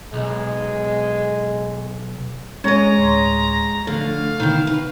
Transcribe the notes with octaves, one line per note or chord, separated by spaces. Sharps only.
B1 G#3
G#3 C#4 C#5 D#5 A#5
D2 A2 C6
D3 F3 A3 F5
B2 D3 D#3 E4
B4